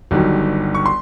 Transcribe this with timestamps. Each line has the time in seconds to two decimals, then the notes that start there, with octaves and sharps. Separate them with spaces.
0.11 G1 G2 D#3 F#3
0.75 C#6
0.86 C6